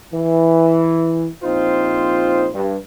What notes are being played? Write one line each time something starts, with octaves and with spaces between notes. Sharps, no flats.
E3
A#1 C4 D#4 F4 C5
G2